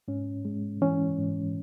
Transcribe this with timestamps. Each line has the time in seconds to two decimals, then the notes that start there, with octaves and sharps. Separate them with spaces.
0.08 G#2 C#4
0.45 G#3
0.82 E3 C#4
1.19 G#2